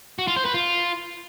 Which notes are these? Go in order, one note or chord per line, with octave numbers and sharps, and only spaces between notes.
F#4
F4
C5
B4
F4